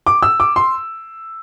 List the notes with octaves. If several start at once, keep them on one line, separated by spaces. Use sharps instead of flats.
D6
E6
D6
C6